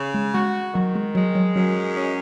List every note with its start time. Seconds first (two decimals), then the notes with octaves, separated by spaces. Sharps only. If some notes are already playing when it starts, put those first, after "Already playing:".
Already playing: C#3
0.14 G#3
0.34 G#3 F#4
0.74 D#3 F#3
0.95 G#3
1.15 F#3 G#3
1.35 F#3
1.55 F#2 F#3
1.96 C#4